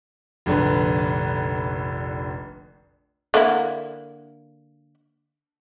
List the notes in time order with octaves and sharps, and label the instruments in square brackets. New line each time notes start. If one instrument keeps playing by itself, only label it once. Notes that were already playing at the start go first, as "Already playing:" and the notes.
[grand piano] F1 A#1 D3 B4
[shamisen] D3 A#3 E4